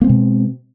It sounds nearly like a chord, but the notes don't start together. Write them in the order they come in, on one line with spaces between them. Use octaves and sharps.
A#3 C4 G#3 B2